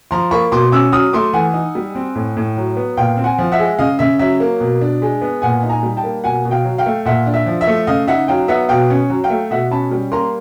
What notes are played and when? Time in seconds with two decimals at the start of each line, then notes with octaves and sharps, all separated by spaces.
0.11 F3 A#5 C6
0.31 A#3 B5 C#6
0.52 B2 C6 D6
0.72 C#4 D6 E6
0.92 F#3 D#6 F6
1.13 A3 C6 D6
1.33 E3 F#5 G#5
1.54 D#4
1.75 G3
1.95 C4
2.15 A2
2.37 A2
2.57 F#3
2.77 B3
2.97 A#2 F5 G5
3.17 C4
3.24 F#5 G#5
3.38 F3
3.52 E5 F#5
3.59 G#3
3.79 C#3 D#5 F5
3.99 C#3 E5
4.19 F#3 E5
4.40 A#3
4.60 B2
4.81 D4
5.02 G#3
5.22 B3
5.42 A#2 F#5 G#5
5.63 D#4
5.69 G#5 A#5
5.83 G3
5.97 G5 A5
6.04 A#3
6.24 B2 F#5 G#5
6.45 B2
6.51 F5 G5
6.64 F#3
6.78 F5 G5
6.86 A3
7.05 A#2 E5 F#5
7.26 D4
7.34 E5
7.46 F3
7.61 E5
7.67 A3
7.87 C#3 D#5 F5
8.07 D#4 E5 F#5
8.28 F#3 F5 G5
8.48 B3 E5 F#5
8.69 B2 F5 G5
8.90 C#4
9.10 F#3
9.24 F5 G5
9.30 A3
9.50 B2 E5 F#5
9.71 C#4 A5 B5
9.91 G3
10.12 A#3 A#5 C6